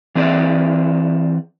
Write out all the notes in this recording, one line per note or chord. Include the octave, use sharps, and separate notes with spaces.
E3 C4 G#4 B4 D5 E5